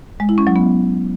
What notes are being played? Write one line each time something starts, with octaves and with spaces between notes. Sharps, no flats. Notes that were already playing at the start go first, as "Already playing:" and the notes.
G#3
E4
C#4
F#3
B3